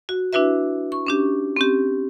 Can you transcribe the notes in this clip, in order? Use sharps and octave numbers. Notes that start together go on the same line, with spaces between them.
F#4
D4 E4 F#4 B4 E5
C#6
C#4 D4 G4
C4 C#4 G4